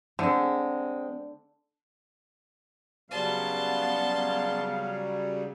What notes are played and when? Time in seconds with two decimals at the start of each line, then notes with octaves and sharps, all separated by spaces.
0.19 D3 G#3 C4
3.10 C#3 F#3 G3 B3 F5 A5 C6